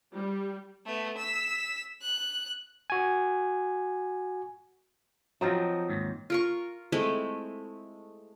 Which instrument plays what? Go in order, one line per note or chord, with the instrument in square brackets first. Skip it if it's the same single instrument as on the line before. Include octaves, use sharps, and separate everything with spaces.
[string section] G3
[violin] A3 B3
E6 B6
F#6
[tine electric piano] F#4 G#5
[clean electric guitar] F3 D#4 [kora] F#3 C4 F4
[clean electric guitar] D#2 G#2
[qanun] F4 A#4 C#6
G#3 A3 C4 E4